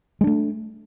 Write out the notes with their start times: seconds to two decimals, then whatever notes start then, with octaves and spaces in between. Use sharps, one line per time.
0.21 G#3
0.24 D4
0.27 A3